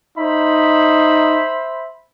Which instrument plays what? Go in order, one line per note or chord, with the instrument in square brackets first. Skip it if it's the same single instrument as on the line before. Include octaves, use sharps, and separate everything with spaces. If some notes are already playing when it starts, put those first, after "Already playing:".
[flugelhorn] D#4 [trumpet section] C5 E5 B5